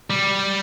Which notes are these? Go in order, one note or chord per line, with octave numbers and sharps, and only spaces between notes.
G3